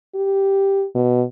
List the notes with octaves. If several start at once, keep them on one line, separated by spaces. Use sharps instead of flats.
G4
B2